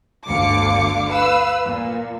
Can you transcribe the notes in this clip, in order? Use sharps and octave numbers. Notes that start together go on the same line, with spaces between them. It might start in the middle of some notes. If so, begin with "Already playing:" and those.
G1 D2 D3 F5 D6 C#7
B4 F5 E6
A#2